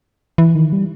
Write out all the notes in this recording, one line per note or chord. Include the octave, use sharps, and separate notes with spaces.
E3
D#3
G3